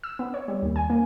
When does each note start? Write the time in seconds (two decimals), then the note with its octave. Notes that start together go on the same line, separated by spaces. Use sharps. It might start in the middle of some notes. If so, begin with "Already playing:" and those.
0.04 E6
0.19 B3
0.34 C#5
0.48 G3
0.62 D#2
0.76 G#5
0.90 A#3